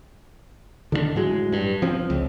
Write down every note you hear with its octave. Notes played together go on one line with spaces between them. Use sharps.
D3 D#3 A3 D4
A2 F#3 G#3
G2
F3 C4
C#2